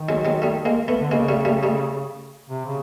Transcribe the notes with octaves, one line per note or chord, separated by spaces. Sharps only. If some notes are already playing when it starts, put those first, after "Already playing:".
Already playing: D#3
F#3 G#3
F#3 G#3
G3 A3
G#3 A#3
A3 B3
D3
C#3 G#3 A#3
G3 A3
G3 A3
G3 A3
C3
C#3